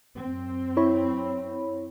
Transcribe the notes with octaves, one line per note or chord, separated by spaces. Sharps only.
F#2 C4
E4 C#5 B5